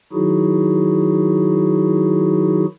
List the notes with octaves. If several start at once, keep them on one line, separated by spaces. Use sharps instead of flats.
D#3 F#3 D#4 E4 F#4 G#4